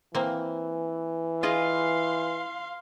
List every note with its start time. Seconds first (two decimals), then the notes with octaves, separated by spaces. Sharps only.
0.15 E3 A#3 C4
1.43 F4 G#4 D#5 F5 C6